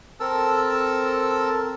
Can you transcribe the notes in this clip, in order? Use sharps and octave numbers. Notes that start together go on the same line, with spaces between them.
C4 A4 A#4 A5 E6